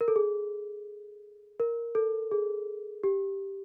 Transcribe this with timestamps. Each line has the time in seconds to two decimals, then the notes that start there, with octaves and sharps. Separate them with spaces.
0.01 A#4
0.08 A4
0.16 G#4
1.60 A#4
1.95 A4
2.31 G#4
3.04 G4